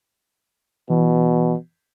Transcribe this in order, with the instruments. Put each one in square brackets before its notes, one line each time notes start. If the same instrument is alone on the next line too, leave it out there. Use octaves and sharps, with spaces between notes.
[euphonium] B2 [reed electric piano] E3